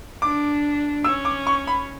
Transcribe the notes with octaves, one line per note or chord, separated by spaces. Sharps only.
D4 D6
C#4 E6
D6
C#6
B5